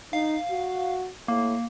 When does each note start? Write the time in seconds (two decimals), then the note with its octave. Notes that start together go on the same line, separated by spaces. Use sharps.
0.13 D#4 F5
0.52 F#4
1.28 A2 A#3